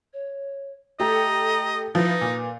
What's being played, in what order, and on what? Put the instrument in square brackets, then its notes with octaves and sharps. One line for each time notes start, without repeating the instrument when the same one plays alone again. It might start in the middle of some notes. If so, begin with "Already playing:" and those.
[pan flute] C#5
[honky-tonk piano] A3 G4 A4 [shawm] D#5 [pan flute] A#5
[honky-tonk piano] F3 E4 [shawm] D#4 [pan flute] B4
[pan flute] B4
[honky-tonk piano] A#2